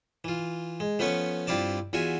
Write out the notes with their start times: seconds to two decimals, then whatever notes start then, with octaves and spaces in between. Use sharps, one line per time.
0.24 E3 F4
0.80 G#3
0.99 F3 A3 B3 C#4 B4 C#6
1.47 G2 C4 E4 F4 D5 A5
1.93 E2 F4 F#4 E5 G#5